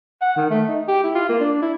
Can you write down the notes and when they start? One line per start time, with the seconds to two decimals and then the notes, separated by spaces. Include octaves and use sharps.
0.22 F#5
0.36 D#3
0.50 A3
0.68 D#4
0.88 G4
1.03 E4
1.15 F4
1.29 A#3
1.40 D4
1.62 E4